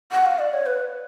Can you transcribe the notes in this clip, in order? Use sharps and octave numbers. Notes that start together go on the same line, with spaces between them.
F#5
F5
D5
C#5
B4